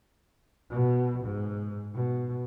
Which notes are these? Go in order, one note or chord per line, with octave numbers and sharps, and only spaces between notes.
B2
G#2
B2